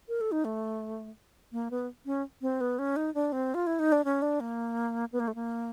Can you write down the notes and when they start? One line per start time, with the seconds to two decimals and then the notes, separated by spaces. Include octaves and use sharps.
0.09 A#4
0.21 A4
0.32 D#4
0.45 A3
1.52 A#3
1.71 B3
2.06 C#4
2.42 C4
2.61 B3
2.79 C#4
2.96 D#4
3.14 D4
3.32 C4
3.54 F4
3.67 E4
3.79 D#4
3.92 D4
4.05 C#4
4.22 D4
4.40 A#3
5.12 B3
5.20 A#3
5.28 A3
5.35 A#3